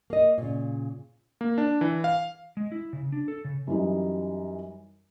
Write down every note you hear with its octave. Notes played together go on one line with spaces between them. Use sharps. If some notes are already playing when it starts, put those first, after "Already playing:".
A#3 D#5
A#2 C#3
A#3
D4
E3
F5
G#3
E4
C#3
D4
A4
C#3
F#2 E3 G3 D#4